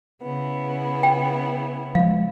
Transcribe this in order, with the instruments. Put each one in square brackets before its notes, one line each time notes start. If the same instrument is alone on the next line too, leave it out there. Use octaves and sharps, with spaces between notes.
[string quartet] C#3 B3 E4
[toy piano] G5
[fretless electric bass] F3 G#3 [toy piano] F5